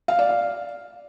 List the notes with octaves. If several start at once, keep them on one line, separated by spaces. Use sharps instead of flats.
F5
D5
F5